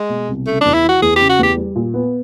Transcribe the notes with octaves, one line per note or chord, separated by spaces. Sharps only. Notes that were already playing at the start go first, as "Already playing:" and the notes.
Already playing: G#3
B2
C2
C#3 A3
E2 D4
E4
E3 F#4
E2 G#4
C#3 G4
F#4
E2 G4
G3
A#2
B3